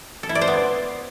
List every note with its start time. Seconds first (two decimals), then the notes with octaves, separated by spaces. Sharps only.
0.23 A4
0.29 E4
0.35 D5
0.41 C5
0.48 B3